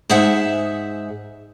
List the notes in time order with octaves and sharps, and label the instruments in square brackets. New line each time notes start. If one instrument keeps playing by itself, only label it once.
[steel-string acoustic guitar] G#2 G#4 C5 E5 F#5